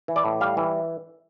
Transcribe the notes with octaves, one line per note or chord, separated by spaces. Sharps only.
E3
D5
A2
G3 F5
E3